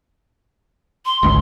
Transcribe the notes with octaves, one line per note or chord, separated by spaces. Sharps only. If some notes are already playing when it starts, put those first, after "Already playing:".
C6
G#1 C#2